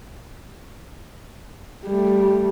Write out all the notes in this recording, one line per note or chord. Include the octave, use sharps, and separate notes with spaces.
G3 A3